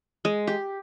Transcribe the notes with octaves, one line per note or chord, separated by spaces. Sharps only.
G#3
G4